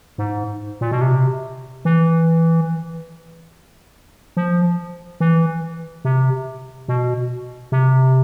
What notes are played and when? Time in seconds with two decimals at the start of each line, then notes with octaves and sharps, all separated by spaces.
0.18 G#2
0.81 A#2
0.91 B2
1.01 C3
1.85 E3
4.37 F3
5.20 E3
6.05 C3
6.88 B2
7.72 C3